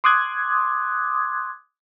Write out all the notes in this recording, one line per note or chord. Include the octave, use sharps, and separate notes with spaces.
C6 D6 D#6 F#6 G#6